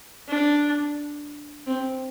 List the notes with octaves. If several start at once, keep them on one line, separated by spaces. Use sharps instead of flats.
D4
C4